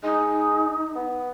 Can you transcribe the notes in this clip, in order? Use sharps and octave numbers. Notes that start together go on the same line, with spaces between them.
G#3 D#4
B3